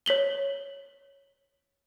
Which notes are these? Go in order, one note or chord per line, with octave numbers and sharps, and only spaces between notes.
C#5 B6 F#7 G7